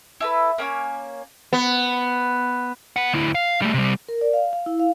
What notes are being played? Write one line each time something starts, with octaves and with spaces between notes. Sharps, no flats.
E4 A4 B4
A#3 C#4 C#5 D6
B3
B3 F#5
D2 E4
F5
G3 A3
C3 G3
A#4
D5
F5
F5
E4
F5